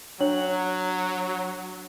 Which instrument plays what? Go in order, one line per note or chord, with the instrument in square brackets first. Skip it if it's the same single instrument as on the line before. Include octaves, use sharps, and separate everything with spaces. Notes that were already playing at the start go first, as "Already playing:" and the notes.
[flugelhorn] F#3 [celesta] D4 C#5 F#7